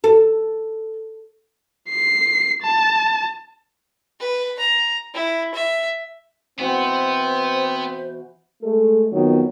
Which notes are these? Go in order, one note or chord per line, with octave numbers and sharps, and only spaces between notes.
A4
C7
A5
B4
A#5
E4
E5
B2 E3 B3 C4 F#4 C5
G#3 A3 A4
F2 D#3 F#3 B3 F#4